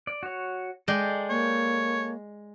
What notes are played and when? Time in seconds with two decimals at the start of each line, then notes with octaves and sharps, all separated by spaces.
0.07 D5
0.23 F#4 C#5
0.88 G#3 A4 D5 G5
1.30 A#3 C#5